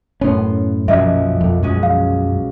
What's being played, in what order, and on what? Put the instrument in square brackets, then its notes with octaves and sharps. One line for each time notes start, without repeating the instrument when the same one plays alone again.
[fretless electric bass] F#2 A2 C#4 [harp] B3 C6
[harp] B1 A#2 F3 [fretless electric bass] F#2 [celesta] D#5 E5
[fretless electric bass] F2
[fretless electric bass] F#2 [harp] G#3 C#4 F#4
[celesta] F5